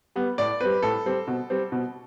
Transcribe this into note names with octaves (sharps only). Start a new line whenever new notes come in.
G3 B3
A2 D5
G3 C4 B4
A2 A4
G3 C4
B2
G3 C4
B2